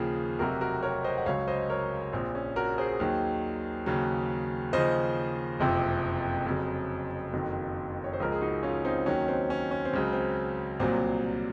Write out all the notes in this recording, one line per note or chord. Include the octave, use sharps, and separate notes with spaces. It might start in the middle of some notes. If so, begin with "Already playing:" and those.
Already playing: D#2 C#3 F3 G#4
F1 F2 C3 F#3 F#4 A#4
F#4 A#4
A#4 C#5
C5 D#5
F#5
C#2 C#3 F#3 C#5 F5
C5 D#5
A#4 C#5
A#1 A#2 F3 C4
C#4
F#4 A#4
G#4 C5
D#2 D#3 F#3
D#2 C#3 F#3
D#2 C#3 F3 C5 D#5
F#1 F2 C3 F3
F2 C#3 F#3
F#1 F2 D#3 F#3
C#5
C5
C#2 C#3 F3 A#4
G#4
D#4 F#4
C#4 F4
C4 D#4
D#2 D#3 F#3 C#4
C4
C#4
C#4
C4
C#2 C#3 F#3
C4
C2 A#2 F#3 C4